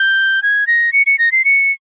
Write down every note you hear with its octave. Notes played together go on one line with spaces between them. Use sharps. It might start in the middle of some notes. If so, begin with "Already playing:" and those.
Already playing: G6
G#6
A#6
C#7
C#7
A#6
C7
C#7